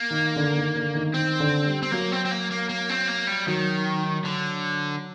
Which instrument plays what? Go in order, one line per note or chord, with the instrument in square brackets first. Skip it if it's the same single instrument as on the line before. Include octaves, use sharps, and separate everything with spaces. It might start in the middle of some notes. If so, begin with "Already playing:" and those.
Already playing: [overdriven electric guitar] A#3
[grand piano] D#3
D3
D#3
D3
D#3
[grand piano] D#3 [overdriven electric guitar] C4
[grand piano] D3
G3
[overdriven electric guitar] C4
[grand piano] F#3 [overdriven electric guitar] A#3
[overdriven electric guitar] C4
C4
A#3
A#3
A#3
C4
A#3
G3
[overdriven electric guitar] D#3 [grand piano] F#3
[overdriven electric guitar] D3